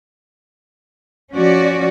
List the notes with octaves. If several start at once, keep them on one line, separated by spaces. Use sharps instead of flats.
F3 C#4 F#4 D5